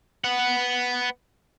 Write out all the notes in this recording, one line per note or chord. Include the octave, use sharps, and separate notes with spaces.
B3 F#5